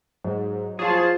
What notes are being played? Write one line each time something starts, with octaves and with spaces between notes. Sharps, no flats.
G#2 F#3
F3 F4 G#4 C5 C#5 A5